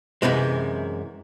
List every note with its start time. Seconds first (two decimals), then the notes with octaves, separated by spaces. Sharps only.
0.22 F#2 A2 C3 E3 G#3